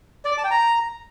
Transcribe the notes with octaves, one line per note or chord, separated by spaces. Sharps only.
D5
D6
A5
G5
A#5